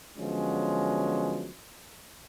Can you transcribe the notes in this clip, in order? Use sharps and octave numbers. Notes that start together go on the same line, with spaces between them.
D3 F3 F#3 G#3 B3 C#4